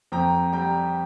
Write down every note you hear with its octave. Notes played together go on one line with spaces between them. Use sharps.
F2 G5 A#5
G3 G5 A#5